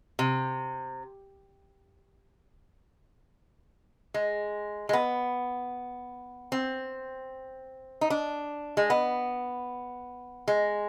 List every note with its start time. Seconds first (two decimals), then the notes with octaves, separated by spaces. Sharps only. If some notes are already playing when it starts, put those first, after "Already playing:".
0.19 C3
4.14 G#3
4.89 G#3
4.93 B3
6.52 C4
8.01 D#4
8.10 D4
8.77 G#3
8.90 B3
10.48 G#3